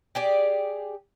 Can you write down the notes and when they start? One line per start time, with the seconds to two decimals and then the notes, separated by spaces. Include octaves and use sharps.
0.15 G4 G#4 D5